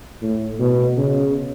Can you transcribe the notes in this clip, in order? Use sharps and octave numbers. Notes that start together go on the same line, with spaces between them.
A2
B2
C#3